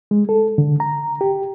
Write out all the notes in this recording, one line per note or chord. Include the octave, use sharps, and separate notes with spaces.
G#3
A4
D3
A#5
G4